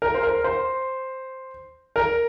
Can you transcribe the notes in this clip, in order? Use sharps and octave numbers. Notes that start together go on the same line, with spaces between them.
A#4
C5
A#4
C5
A#4